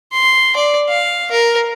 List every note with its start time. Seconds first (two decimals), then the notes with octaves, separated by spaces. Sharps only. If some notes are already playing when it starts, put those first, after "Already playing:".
0.12 C6
0.56 D5
0.89 F5
1.31 A#4